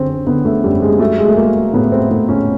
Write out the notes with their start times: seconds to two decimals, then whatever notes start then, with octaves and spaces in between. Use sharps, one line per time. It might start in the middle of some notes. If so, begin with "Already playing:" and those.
Already playing: F#2 D3 C4 C#4
0.27 D3 B3
0.45 A3
0.64 F#2 G3
0.82 G#3
1.00 F#3 A3
1.19 G#3
1.28 A3
1.37 F#3 A#3
1.73 A2 B3
1.92 C4
2.10 A2
2.29 C#4